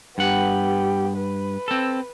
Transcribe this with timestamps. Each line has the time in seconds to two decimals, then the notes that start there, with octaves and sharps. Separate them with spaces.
0.18 G2 B3 G4 F#5
1.17 B4
1.68 C4 A4